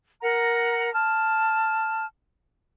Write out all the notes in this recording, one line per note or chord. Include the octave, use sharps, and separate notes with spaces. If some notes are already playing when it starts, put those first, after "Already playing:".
A#4 F#5 A#5
A5 F6